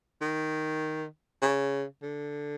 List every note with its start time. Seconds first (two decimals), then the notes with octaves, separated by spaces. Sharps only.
0.21 D#3
1.42 C#3
2.02 D3